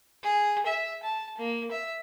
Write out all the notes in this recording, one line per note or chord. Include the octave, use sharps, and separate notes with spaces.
G#4
E5
A5
A#3
E5